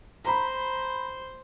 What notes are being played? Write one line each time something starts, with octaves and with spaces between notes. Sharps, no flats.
C5 A#5 B5